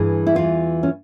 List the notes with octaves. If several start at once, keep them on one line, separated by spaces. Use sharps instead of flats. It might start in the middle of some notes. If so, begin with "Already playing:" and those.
Already playing: G2 E3 G#4
E4
E2 E3 F4
C#4